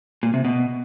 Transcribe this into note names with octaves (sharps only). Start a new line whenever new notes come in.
A#2
C3
B2